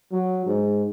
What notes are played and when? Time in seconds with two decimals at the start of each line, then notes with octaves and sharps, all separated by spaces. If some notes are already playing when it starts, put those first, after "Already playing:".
0.12 F#3
0.46 G#2